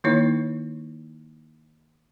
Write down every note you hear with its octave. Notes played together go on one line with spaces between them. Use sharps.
D#3 A#3 D#4 E4 C#5